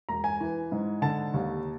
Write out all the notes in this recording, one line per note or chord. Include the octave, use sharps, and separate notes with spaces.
E1 A#5
G#5
E3
G#2
D3 A5
D#2